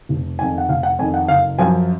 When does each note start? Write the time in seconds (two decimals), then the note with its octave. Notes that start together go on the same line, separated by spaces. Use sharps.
0.09 F1
0.39 F2 D#3 G#5
0.58 F#5
0.69 F1 F5
0.83 F#5
0.99 F2 G#5
1.02 D#3
1.14 F#5
1.28 F#1 F5
1.59 F#2 F3 G#5